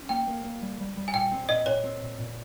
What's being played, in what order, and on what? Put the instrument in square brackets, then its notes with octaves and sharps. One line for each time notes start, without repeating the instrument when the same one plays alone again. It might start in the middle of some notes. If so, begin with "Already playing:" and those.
Already playing: [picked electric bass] C#4
[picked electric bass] A#3 [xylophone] G5
[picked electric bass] A#3
A#3
G3
G3
G3
[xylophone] G#5
[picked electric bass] A#2 [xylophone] G5
[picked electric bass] C4
[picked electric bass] A#2 [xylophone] D#5
[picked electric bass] A#2 [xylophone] C#5
[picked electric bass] C4
A#2
A#2